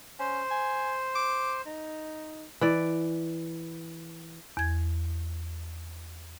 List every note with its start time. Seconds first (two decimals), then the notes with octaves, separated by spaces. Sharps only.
0.19 C#4 C5
0.51 G#5
1.15 D6
1.66 D#4
2.61 E3 D5
4.57 E2 G#6